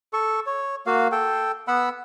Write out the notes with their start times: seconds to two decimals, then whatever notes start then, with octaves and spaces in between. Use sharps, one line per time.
0.13 A4 C#6
0.46 C#5
0.86 A#3 F#4 F5
1.12 A4 G5
1.68 B3 F#5 B5 E6